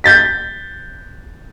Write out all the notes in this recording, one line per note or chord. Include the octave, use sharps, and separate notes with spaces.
G6 A6 B6